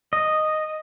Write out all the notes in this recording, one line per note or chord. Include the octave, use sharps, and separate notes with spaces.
D#5